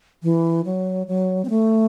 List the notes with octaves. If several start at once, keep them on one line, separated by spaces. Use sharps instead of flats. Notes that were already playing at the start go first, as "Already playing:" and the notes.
E3
F#3
F#3
C4
A3